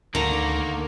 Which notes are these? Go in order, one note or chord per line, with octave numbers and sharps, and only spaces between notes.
D2 D3 D#3 A#3 D#4 A#5